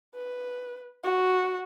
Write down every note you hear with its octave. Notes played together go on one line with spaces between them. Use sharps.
B4
F#4